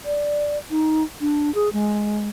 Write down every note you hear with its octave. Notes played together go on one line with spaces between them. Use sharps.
D5
D#4
D4
G#4
G#3